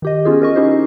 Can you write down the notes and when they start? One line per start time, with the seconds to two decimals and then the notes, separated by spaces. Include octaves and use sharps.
0.02 D#3 G4 D#5
0.25 B3 C#4 F4 G#4
0.42 A#4 D#5 C#6
0.56 C#4 D#4 E4 G4 C5